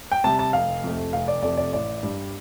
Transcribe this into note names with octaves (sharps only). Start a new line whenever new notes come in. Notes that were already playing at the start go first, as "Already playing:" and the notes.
G5
C3 G3 A5
A5
F1 F5
F2 C3 A3
F1 F5
D5
F2 C3 A3 D5
D5
A1 D5
G2 G3